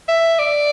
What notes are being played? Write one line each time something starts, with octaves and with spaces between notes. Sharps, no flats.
E5
D5